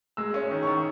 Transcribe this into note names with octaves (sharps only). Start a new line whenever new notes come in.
G#3 E6
C#4
D#3
D#3 C#6